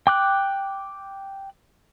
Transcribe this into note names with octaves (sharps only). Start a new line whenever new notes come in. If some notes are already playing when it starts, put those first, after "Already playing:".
G5 D6 F#6